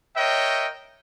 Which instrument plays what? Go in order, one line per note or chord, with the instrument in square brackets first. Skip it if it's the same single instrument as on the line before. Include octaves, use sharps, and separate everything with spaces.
[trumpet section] A#4 C#5 D#5 E5 G5